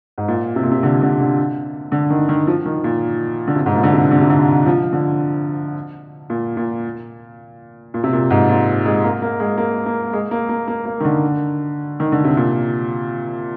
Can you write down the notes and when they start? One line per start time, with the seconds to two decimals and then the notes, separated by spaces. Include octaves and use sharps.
0.18 G#2
0.28 A#2
0.56 C3
0.63 A#2
0.71 C3
0.83 D3
1.02 D3
1.20 D3
1.92 D3
2.10 D#3
2.29 D#3
2.47 F3
2.65 D#3
2.84 A#2
3.47 D3
3.56 C3
3.66 G#2
3.75 A#2
3.83 D3
3.93 C3
4.11 D3
4.21 C3
4.30 D3
4.66 F3
4.93 D3
6.30 A#2
6.57 A#2
7.94 A#2
8.04 C3
8.13 A#2
8.30 G#2
8.49 A#2
8.86 G#3
9.04 A#3
9.22 A#3
9.40 G#3
9.58 A#3
9.86 A#3
10.13 G#3
10.31 A#3
10.49 A#3
10.68 A#3
10.86 A#3
11.00 D#3
11.05 D3
12.00 D#3
12.12 D3
12.24 C3
12.37 A#2